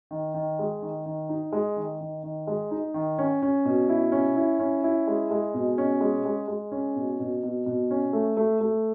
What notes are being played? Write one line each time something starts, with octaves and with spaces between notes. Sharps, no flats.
D#3
D#3
G#3
D#3
D#3
D#4
G#3
D#3
D#3
D#3
G#3
D#4
D#3
C#4
C#4
B2
E4
C#4
E4
C#4
E4
G#3
G#3
B2
C#4
G#3
G#3
G#3
C#4
B2
B2
B2
B2
C#4
A3
A3
A3